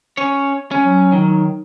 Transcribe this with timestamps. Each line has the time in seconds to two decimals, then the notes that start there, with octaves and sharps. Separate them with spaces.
0.17 C#4 C#5
0.71 C#4
0.84 F#3
1.12 D#3